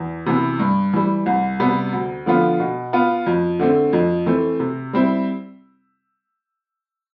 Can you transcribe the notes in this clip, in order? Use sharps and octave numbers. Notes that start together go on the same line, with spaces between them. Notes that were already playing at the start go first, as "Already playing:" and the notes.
Already playing: E2
C3 E3 B3
G2
E3 G3
C2
C3 G3 B3
D2
D3 F3 B3 F4
B2
B3 F4
F2
D3 A3 C4
F2
E3 A3 C4
C3
G3 C4 E4